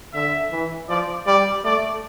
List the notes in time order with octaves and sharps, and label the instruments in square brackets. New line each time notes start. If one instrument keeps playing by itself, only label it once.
[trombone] D3 [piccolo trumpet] E5
[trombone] E3
[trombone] F3 [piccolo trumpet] D5
[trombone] G3 [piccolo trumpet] D5
[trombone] A3 [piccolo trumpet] D5